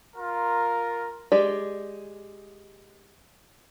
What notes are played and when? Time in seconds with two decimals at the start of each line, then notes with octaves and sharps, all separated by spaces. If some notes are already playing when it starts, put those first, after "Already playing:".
0.16 F4 A#4
1.32 G#3 G4 D5